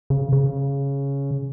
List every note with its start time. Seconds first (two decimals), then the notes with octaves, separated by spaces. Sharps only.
0.10 C#3
0.33 C#3